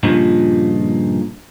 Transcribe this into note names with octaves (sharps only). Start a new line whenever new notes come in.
G2 A#2 C#3 F3 D#4